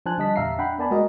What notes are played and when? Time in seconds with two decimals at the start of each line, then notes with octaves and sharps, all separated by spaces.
0.06 F3 D4 C5 G#5 A5 F#6
0.18 D3 G3 D#5 A5 B6
0.36 E2 A#2 E5 F5 A#5 C7
0.58 D4 F#5 G5 B5
0.78 B3 A#4 D5 G#5 A5 B5
0.91 G#3 A#3 F#4 A#4 D#5